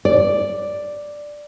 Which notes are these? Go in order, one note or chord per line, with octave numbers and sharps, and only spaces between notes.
D5